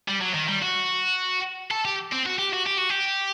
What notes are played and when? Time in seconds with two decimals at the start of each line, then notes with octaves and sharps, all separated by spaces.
0.08 G3
0.21 F#3
0.34 D#3
0.48 G3
0.62 F#4
1.71 A4
1.85 G4
2.12 C4
2.26 F#4
2.39 G4
2.53 F#4
2.66 G4
2.78 F#4
2.90 G4